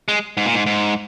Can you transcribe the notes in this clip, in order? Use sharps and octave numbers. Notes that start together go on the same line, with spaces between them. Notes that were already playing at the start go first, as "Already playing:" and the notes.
G#3
G#2
A#2
G#2
G#2